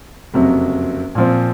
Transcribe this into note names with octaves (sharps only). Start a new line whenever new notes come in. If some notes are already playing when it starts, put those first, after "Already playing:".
F#1 F2 C3 F#3
A#2 F3 C4